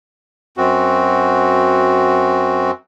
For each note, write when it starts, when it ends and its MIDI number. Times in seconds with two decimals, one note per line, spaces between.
0.57 2.71 42
0.57 2.71 60
0.57 2.71 66